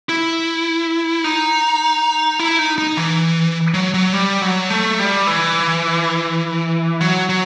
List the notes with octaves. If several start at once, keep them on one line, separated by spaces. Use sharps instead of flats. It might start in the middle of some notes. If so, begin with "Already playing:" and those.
E4
D#4
E4
D#4
D#4
E3
F#3
F#3
G3
F#3
A3
G3
E3
F#3
F#3